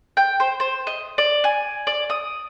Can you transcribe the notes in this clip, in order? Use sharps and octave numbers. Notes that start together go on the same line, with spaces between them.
G5
C5
C5
D#5
D5
G#5
D5
D#6